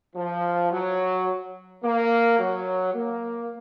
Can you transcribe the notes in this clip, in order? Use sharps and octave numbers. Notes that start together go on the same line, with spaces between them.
F3
F#3
A#3
F#3
A#3